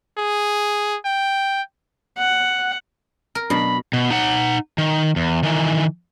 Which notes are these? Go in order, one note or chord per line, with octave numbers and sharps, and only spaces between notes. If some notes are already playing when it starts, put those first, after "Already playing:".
G#4
G5
F#5
A#4
B2 F#3 D4 B5 A#6
B2
D#4 F#5
D#3
E2
D#3 E3